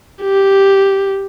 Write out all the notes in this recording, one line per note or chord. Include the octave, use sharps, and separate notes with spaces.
G4